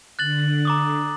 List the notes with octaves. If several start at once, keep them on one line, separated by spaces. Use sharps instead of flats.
D3 F#6 A6 F#7
A#5 D6 D#6